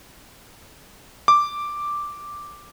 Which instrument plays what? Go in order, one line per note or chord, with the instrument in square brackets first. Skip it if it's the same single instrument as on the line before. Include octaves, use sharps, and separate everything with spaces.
[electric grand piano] D6